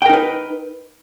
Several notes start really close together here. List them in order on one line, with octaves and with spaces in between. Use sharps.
G5 A#4 D#4 B4